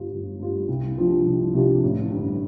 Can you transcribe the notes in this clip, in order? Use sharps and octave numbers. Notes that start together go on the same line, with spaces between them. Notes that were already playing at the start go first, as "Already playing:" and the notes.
Already playing: G1 G2 G3 F4
G1
G2 G3 F4
C2
C3 F3 D4 F4
C2
C3 F3 D4 F4
A1
G2 D3